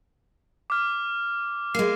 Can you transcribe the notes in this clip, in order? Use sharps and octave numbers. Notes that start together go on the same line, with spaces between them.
D6 F6
G#3 A#3 C7